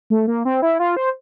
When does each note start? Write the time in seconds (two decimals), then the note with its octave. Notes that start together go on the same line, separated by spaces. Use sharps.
0.10 A3
0.28 A#3
0.45 C4
0.62 E4
0.79 F4
0.97 C5